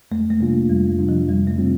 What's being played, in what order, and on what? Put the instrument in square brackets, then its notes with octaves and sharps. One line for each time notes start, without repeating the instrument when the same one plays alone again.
[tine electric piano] F2 [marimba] A3
[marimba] A3
[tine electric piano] C3 G3 D4 F4 [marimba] A#3
[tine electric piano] F2 [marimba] G3
[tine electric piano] C3 G3 D4 F4
[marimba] F3
[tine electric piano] F2 [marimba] G3
[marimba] A3
[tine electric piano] C3 G3 C4 F4